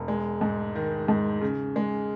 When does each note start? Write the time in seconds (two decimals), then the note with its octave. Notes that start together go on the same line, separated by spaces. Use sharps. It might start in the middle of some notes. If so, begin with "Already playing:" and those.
Already playing: E1
0.08 G#3
0.41 G#2
0.75 D#3
1.08 G#2
1.41 C#3
1.76 G#3